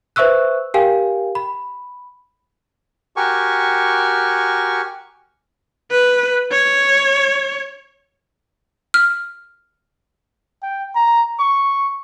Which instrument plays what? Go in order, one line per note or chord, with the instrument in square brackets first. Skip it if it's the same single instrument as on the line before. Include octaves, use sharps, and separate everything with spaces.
[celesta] B4 C5 E5 C#6 E6 F#6
G4 A#4 F5 G5 G#5
B5
[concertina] F#4 G4 A#4 G#5 C#6
[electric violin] B4
C#5
[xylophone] F6
[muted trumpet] G5
A#5
C#6